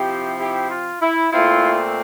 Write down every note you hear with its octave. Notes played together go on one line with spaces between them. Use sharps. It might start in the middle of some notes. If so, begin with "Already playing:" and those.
Already playing: C3 F3 C4 E4 G4
E4 G4
F4
E4
A#2 A3 C4 E4 F4